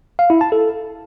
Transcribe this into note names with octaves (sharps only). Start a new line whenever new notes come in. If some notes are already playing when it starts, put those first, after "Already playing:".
F5
E4
A5
A4